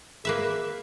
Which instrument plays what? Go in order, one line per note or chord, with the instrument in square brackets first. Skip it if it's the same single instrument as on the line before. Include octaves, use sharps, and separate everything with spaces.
[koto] A#3 B4 E5 [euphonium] G#4